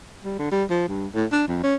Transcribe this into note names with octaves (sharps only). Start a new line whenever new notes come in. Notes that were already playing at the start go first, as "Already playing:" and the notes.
G3
D3
G3
F3
G2
A2
D4
F2
C#4